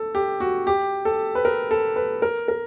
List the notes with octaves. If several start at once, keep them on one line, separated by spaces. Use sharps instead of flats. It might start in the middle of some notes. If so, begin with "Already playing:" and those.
Already playing: A4
G4
F#4
G4
A4
B4
A#4
A4
B4
A#4
A#4